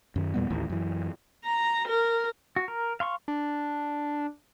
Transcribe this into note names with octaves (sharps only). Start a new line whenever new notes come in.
F#2 D#3
E2 A#2 G3 B3
A1 D#2 A2
F#2 E3
A#5
A#4
F#4
A#4
F5 C6 C#6
D4